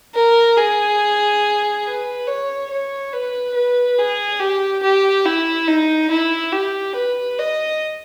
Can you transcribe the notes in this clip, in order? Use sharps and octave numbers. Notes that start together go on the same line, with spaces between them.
A#4
G#4
B4
C#5
C#5
B4
B4
G#4
G4
G4
E4
D#4
E4
G4
B4
D#5